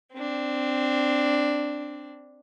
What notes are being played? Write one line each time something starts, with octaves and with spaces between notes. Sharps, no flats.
C4 D4